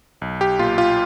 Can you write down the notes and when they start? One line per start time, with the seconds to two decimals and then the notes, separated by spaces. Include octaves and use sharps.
0.22 B1
0.41 G4
0.59 A#2 F4
0.78 F4